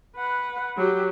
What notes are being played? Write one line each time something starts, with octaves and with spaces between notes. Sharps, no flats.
B4 F#5
F#3 G4